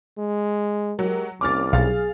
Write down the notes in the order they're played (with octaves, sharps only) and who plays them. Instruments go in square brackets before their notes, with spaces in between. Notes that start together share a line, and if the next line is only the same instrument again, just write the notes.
[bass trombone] G#3
[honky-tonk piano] F#3 [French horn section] G#3 G4 A#4
[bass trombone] C2 [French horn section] A#3 C#4 [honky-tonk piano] D6 F6 A6
[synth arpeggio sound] B1 [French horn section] G#4 [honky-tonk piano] F5 A6